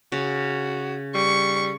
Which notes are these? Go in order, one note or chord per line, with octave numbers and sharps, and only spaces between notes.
C#3 F#4
G3 C#6